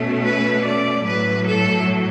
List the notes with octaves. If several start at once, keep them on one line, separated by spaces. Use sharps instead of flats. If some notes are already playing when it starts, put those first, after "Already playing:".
Already playing: B2 A3 C#4
B4
D5
A2 F#3 A3 B4
A4